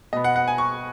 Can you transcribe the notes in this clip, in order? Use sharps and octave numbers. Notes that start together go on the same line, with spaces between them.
B2 B3 D#5
F#5
F#5
G#5
C#6